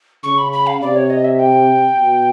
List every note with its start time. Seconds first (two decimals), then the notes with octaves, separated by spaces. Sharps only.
0.23 C#3 C#6
0.38 B5
0.52 B5
0.67 F5
0.81 C3 D5
0.96 C#5
1.10 D#5
1.24 E5
1.39 G5
1.97 B2